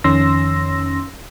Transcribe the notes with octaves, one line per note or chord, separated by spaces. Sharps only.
F2 D#3 C#4 C6 E6 A#6